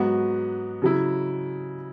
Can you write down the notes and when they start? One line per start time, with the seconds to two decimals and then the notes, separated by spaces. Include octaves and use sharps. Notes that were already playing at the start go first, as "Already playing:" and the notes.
Already playing: G#2 F#3 B3 F#4
0.82 C#3 F#3 E4